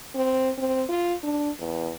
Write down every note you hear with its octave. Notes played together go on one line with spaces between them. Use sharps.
C4
C4
F4
D4
E2